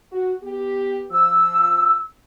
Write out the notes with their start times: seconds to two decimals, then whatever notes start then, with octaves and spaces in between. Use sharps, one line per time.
0.12 F#4
0.43 B3 G4
1.11 F3 E6